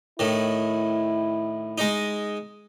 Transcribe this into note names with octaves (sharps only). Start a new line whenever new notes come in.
A2 D#3 E4
G#3 D#4